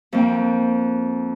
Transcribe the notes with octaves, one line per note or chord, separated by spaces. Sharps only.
F2 A#3 G5